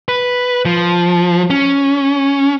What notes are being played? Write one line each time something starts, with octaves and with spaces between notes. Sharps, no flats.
B4
F3
C#4